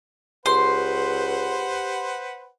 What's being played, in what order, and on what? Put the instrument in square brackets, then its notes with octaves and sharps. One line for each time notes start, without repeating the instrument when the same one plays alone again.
[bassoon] C#2 [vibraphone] G4 [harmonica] B4 C5 F#5 [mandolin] C6